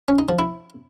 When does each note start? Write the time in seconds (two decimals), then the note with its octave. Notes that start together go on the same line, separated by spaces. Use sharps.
0.08 C#4
0.19 D#4
0.29 F3
0.39 E4